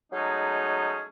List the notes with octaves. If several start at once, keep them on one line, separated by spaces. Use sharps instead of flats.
F#3 G#3 A3 C#4 D#4 G#4